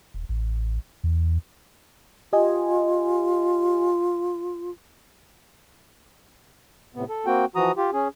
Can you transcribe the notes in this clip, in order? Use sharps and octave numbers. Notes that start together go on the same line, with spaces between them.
D#1
A1
E2
F4 G4 D#5 G#5
A2 C3 B3
A4
A#3 C4 F#4 G5
E3 F3 F#4 A#5 D#6
F4 G4
C#4 G#4